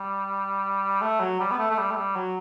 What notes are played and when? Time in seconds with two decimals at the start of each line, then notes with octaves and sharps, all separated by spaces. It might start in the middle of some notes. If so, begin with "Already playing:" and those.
Already playing: G3
1.02 A3
1.20 F#3
1.40 G3
1.51 B3
1.59 A3
1.70 A3
1.78 G3
1.90 A3
1.96 G3
2.16 F#3